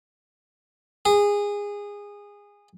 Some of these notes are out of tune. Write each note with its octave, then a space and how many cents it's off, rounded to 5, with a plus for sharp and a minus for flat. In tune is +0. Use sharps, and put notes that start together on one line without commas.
G#4 -20